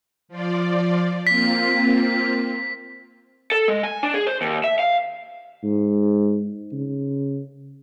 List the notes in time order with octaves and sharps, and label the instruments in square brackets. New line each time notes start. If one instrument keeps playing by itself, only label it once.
[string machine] F3 F4 D5
[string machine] A#3 C4 F4 [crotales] B6
[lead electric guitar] A4
G#3
G#5
D4
G#4
C5
D#2
E5
F5
[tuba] G#2
C#3